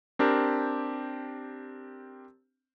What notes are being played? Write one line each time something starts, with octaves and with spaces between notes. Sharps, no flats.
C4 D4 G4 A#4